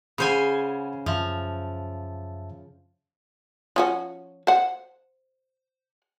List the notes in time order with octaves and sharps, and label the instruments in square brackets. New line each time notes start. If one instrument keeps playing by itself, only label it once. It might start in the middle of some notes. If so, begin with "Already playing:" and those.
[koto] C#3 C5 G#5 [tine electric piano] F#5 B5
[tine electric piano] F#2 E5 A5 [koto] F3
[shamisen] F3 C#4 F#4
C5 F#5